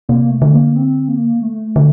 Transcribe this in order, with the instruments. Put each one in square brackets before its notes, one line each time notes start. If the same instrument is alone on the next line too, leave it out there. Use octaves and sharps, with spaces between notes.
[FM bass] C3 [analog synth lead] A#3
[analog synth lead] A3
[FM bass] D3
[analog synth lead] A#3
C4
A#3
A3
[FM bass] D3